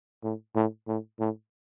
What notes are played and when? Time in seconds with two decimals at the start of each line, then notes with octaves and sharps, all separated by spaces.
0.24 A2
0.55 A2
0.88 A2
1.19 A2